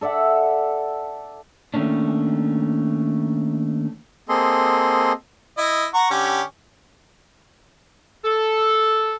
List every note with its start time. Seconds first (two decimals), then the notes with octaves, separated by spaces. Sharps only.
0.01 A4 D5 E5 F#5
1.74 D#3 A3 A#3 C#4 D4
4.29 A#3 C4 G#4 A4 D#5 C6
5.58 E4 D#5
5.94 F#5 A#5 C#6
6.10 D3 C#4 G4
8.24 A4